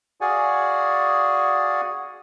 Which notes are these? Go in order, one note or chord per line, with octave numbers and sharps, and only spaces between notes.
F#4 G#4 D5 F5 F#5 G#5